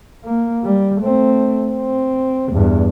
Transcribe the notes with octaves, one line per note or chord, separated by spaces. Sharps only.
A#3
G3
A3 C4
C4
E2 G2